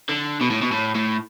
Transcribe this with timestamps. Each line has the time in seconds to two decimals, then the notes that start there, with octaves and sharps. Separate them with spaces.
0.09 D3
0.41 B2
0.50 A2
0.62 B2
0.72 A2
0.95 A2